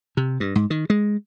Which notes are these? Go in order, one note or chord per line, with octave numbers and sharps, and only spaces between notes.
C3
G2
G#2
D#3
G#3